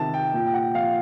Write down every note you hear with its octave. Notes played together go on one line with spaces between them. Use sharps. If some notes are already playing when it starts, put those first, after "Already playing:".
Already playing: C3 D#3 A5
G5
A#2 G5
G5
F#5
F3 F5